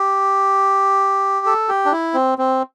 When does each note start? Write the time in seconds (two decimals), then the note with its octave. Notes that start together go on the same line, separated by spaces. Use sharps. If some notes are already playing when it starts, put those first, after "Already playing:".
Already playing: G4
1.46 A4
1.69 G4
1.85 D4
1.92 E4
2.14 C4
2.38 C4